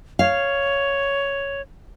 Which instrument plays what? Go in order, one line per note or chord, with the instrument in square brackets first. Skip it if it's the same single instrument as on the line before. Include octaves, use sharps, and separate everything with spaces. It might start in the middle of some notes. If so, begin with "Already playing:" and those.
[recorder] C#5 [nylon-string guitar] F5